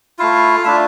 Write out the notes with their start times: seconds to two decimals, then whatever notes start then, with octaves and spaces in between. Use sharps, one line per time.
0.19 A3 E4 F4 F5
0.64 A3 D4 E4 F4 E5